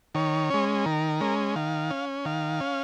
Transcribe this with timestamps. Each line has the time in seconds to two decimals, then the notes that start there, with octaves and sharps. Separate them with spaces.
0.15 D#3 C#5
0.50 G#3 C#4
0.86 D#3 A#4
1.20 G#3 C#4
1.56 D#3 F5
1.90 C#4
2.25 D#3 F5
2.60 C#4